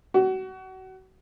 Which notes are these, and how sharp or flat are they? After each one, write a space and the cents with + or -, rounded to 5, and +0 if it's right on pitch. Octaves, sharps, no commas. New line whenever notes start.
F#4 +30